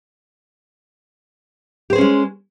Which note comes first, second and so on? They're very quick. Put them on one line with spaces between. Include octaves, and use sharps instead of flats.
G4 C5 G#4 C#4 G#3